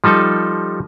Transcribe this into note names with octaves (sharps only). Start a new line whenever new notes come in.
F3 G3 D#4 A4